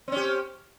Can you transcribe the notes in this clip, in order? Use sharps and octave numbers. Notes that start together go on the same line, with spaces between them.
C4 C#4 G4